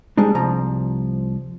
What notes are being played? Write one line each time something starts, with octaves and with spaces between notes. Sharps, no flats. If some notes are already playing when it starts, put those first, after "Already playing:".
G3 G#3 D4 D#4
C2 F3 A#5